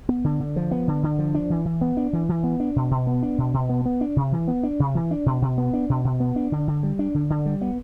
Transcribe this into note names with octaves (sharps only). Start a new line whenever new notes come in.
B3
D3
D3
F3
B3
D3
D3
F3
D4
E3
E3
B3
D4
E3
E3
B3
D4
B2
B2
B3
D4
B2
B2
B3
B3
D4
C3
E3
B3
D4
C3
E3
D4
B2
B2
B3
D4
B2
B2
B3
D4
D3
D3
G3
D4
D3
D3
G3
B3